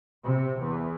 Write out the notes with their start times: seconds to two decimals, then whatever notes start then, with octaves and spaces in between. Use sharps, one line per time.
0.24 C3
0.60 E2